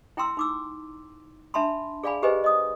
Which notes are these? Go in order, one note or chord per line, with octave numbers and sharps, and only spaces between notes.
E4 G5 A#5 C6 E6
D#4 D6 E6
D4 E5 A5 B5 C6
G#4 D5 F5 G#5 B5
G4 G#4 B4 C5 D#5 G#5
D#5 D#6